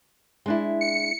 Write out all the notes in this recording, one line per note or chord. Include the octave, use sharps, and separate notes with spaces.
G#3 D4 E4
C#7